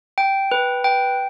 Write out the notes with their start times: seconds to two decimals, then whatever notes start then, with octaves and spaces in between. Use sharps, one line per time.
0.18 G5
0.52 B4
0.84 G5